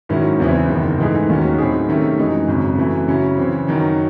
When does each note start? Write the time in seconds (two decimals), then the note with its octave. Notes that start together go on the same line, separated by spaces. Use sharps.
0.09 G#2 D#3 F#3 C#4 E4
0.40 E2 C#3 E3 C4 E4
0.69 F#1 E2 D#3
0.99 G#2 E3 A3 D#4 G#4
1.29 D#2 D#3 F#3 C#4
1.58 A2 F#3 C4 D#4 G#4
1.89 C3 D#3 A3 C#4
2.18 F#2 E3 G#3 D#4
2.48 G#1 F#2 C#3
2.78 F#2 E3 A3
3.08 C#3 F#3 C#4 E4
3.37 C#3 E3 C4
3.67 F#2 D#3 F#3 C#4